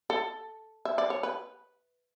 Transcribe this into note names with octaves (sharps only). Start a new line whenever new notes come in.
A4
E5
D5
C#5
B4